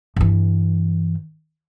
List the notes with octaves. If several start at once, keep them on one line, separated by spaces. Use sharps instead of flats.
G2 E3